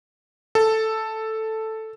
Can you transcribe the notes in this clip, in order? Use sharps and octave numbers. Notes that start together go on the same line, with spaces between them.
A4